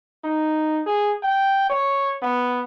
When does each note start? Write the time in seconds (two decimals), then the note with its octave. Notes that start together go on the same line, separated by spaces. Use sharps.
0.24 D#4
0.87 G#4
1.23 G5
1.70 C#5
2.22 B3